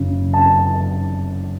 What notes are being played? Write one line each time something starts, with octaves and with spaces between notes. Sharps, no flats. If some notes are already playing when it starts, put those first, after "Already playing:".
Already playing: F#1 F#2 C#3
A5